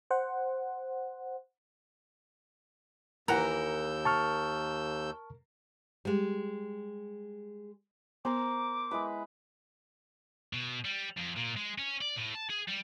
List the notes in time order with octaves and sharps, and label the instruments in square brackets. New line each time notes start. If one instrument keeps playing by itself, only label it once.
[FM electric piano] C5 F#5
[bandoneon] D#2 E6 G6 [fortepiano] E3 F#5 A#5 [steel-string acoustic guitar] A#4
[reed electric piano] A5 C#6 F6
[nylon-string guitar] G3 G#3
[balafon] B3 [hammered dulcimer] A#4 C5 [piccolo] D6
[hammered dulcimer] G#3 E4 B4
[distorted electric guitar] B2
G3
F2
A#2
G#3
C#4
D5
A2
A5
G#4
G3